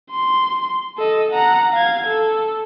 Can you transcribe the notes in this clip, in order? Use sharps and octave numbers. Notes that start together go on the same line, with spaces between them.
C6
A4 D#5
F#5 A#5
F5 G#6
A4